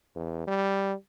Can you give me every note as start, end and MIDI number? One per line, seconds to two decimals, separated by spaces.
0.16 0.42 40
0.47 0.94 55